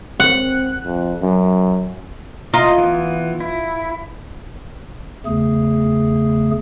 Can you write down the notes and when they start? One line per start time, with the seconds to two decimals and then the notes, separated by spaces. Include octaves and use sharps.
0.20 C4 F#5
0.84 F2
1.22 F#2
2.54 F4 D#5 A#5
2.78 E3 B3
3.40 E4
5.26 E2 C#3 A3 G#4